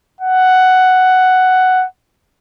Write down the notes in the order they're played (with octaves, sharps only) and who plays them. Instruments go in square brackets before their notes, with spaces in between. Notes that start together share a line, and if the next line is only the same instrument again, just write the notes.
[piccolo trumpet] F#5